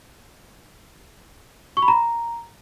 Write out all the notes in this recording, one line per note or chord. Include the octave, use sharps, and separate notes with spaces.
C#6
B5
A#5